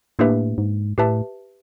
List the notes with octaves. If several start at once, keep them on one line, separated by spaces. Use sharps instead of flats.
A2 A#3 D4 G4 B4 E5
G#2
A2 G4 B4 E5 A5